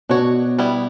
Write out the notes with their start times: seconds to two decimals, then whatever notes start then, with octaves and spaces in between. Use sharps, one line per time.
0.09 B2 D4 F#4 C#5
0.59 G3 B3 E4